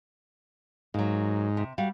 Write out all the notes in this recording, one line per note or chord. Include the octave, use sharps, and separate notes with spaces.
G#2 F#3 A#3
C3
G3 F#4 F5